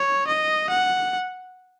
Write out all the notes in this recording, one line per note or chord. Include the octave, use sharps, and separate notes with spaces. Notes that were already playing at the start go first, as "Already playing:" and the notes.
Already playing: C#5
D#5
F#5